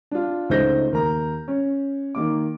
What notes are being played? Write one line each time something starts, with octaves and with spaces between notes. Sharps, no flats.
D4 F4
C#2 A3 D#4 C5 G6 A#6
D#2 A#4 A#5
C#4
D#3 A#3 D6